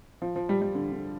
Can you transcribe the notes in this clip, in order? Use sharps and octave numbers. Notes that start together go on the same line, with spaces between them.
F3
F3
G3
G3
D3
D3